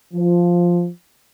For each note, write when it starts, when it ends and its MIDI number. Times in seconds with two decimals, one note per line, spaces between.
0.14 0.89 53